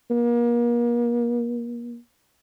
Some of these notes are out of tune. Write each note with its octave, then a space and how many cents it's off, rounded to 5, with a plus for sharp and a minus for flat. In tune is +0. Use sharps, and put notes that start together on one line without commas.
A#3 +35